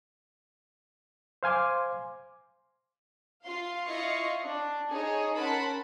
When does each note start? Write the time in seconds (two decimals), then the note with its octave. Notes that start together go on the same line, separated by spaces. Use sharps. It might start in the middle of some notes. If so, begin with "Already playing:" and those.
1.43 C5 F5 G#5 C6 D6
3.44 F4 F5 C6
3.86 E4 F4 D#5 F5 C#6 C7
4.42 D4
4.90 D#4 G#4 C#5
5.36 C#4 A#4 F#5 A5 B5 C6